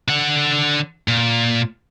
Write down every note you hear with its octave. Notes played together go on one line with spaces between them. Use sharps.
D3 F#5
A#2